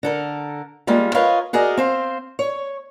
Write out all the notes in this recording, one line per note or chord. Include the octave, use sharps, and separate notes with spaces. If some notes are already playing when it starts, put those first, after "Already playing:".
D3 A4 A#4
G3 G#3 A#3 F4
F4 A#4 B4 C#5 D#5 F5
F#4 G#4 A#4 D5 D#5
C4 C5 F5
C#5